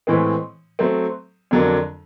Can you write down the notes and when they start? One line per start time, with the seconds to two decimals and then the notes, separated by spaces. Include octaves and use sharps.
0.07 A2 E3 G#3 C4
0.79 F#3 A3 C4
1.51 F2 D3 F#3 A#3 D4